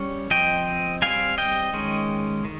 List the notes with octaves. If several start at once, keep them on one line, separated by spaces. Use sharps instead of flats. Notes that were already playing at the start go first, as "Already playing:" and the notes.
Already playing: G3 C#4
F3 C4 D#5 G5
G3 C4 F5 G#5
D#5 G5
D#3 G#3 C#4
D#3